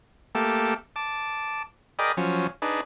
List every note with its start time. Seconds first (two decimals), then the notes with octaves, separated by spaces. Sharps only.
0.35 A3 A#3 G4 A4
0.96 A5 D6
1.99 G#4 A#4 D5 D#5 G5 B5
2.17 F3 F#3 C#4
2.62 D4 D#4 G#4 B4